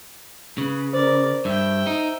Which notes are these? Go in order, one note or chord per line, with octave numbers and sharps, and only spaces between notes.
C#3 B4
A#4 C5 D5
G2 E5 G5
D#4